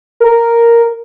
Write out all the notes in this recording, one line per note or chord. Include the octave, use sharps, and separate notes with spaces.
A#4